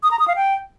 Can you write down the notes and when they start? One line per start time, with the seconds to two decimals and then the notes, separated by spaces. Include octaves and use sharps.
0.03 D#6
0.11 A#5
0.19 D#6
0.28 F5
0.36 G5